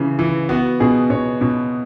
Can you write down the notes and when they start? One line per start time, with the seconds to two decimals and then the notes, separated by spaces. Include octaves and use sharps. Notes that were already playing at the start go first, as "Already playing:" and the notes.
Already playing: C#3 E3
0.19 E3
0.49 B3 F#4
0.80 B2 G#4
1.10 B2 C#5
1.41 B2